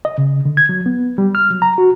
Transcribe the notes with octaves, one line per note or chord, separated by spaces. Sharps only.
D#5
C#3
D3
G#6
F#3
B3
G3
F6
F#3
A#5
F#4